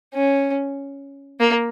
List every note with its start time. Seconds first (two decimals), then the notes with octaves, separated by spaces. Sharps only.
0.14 C#4
1.40 A#3